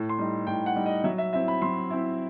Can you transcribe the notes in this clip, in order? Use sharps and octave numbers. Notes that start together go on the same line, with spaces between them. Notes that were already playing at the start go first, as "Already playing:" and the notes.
Already playing: A2
C6
G3 D#4
A2 G5
F#5
G3 D#4
D#5
F#3 E5
E5
C4 E4 E5
B5
F#3 C6
C4 E4